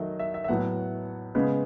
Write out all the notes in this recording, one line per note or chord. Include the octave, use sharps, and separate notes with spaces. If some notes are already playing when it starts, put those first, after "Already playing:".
Already playing: D#3 F#3 A3 D#5 E5
E5
E5
E5
A2 F#3 B3 F#5
C#3 G#3 B3